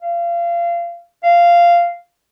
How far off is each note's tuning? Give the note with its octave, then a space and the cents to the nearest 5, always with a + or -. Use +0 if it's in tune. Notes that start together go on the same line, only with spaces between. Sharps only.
F5 -25
F5 -10